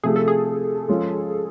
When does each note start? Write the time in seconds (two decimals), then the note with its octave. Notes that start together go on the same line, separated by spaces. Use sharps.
0.04 C3 F3 A3 G#4
0.16 A4
0.28 G#4
0.89 F3 G#3 C#4 F4